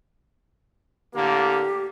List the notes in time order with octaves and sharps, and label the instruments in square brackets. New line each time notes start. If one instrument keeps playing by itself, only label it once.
[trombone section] A2 D3 A#3 [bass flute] G4